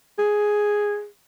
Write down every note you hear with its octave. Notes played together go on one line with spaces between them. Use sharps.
G#4